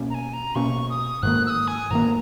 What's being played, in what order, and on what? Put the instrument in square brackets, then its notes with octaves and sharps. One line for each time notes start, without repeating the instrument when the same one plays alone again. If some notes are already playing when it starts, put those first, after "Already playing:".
Already playing: [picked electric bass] B2 A#3 C#4
[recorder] A#5
G#5
A#5
[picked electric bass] B2 A#3 C#4 [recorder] C#6
[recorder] D#6
[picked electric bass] G#2 D#3 A#3 [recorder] F#6
[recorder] E6
D#6
G#5
[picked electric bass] G#2 D#3 A#3 [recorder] A#5